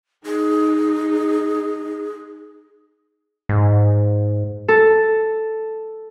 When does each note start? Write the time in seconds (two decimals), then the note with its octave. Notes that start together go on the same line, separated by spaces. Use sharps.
0.26 D#4 G#4
3.49 G#2
4.68 A4